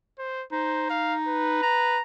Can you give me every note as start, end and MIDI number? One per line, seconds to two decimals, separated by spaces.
0.18 0.44 72
0.52 1.62 63
0.52 0.86 72
0.90 1.15 77
1.28 2.01 71
1.62 2.02 82